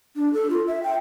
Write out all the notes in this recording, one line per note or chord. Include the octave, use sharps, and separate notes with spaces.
D4
A4
F4
E5
G5